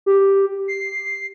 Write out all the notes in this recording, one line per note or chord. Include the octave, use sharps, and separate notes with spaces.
G4
C7